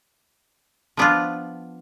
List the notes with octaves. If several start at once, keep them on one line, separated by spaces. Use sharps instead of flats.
F3 B3 D4 F4